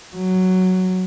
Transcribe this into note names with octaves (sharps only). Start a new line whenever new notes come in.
F#3